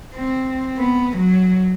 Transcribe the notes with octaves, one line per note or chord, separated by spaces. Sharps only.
C4
B3
F#3